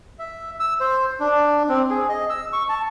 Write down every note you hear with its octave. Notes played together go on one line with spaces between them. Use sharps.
E5
E6
C5
D4
C4
G#4
D#5
E6
C#6
A5